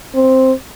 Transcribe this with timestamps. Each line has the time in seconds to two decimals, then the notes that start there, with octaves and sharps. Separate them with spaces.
0.15 C4